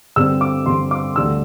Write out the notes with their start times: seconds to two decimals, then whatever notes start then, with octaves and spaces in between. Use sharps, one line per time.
0.16 G2 D3 G3 C4 E6
0.41 D6
0.66 G2 D3 G3 C4 C6
0.91 D6
1.16 D2 D3 G3 D4 E6